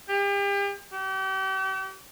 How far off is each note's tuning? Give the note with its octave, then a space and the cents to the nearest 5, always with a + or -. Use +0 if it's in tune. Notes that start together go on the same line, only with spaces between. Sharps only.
G4 +35
G4 -40